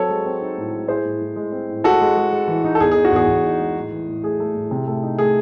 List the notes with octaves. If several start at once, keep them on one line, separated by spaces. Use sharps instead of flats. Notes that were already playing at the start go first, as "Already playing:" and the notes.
Already playing: F#3 C4 A4 C#5
G#3
C4
D#4
A2
G#3
E4 G#4 C5
A2
A2
G#3
C4
A2
G#3 F#4 A4
G#3
G#3
G#3
E3
D#4
A4
E2 G#4
G#4
D#4
F#4
E2 G#4
E2
D#4
G#3
A2
E3
A2
A3 G#4
A3
A2
C3
A3
D#4
A3 G#4